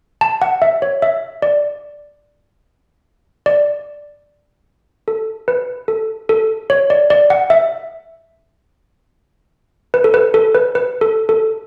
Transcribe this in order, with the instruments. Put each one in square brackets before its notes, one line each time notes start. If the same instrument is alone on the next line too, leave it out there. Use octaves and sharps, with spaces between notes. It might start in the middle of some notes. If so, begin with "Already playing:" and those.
[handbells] A5
F#5
E5
C#5
E5
D5
D5
A4
B4
A4
A4
C#5
D5
D5
F#5
E5
B4
A4
B4
A4
B4
B4
A4
A4